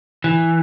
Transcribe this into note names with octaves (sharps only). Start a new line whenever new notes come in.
E3